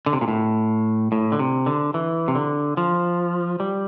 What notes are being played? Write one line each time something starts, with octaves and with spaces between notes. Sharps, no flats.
D3
C3
A#2
A2
A2
D3
C3
D3
E3
C3
D3
F3
G3